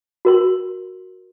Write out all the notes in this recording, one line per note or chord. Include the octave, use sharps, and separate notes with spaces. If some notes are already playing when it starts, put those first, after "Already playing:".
F#4 A#4 C6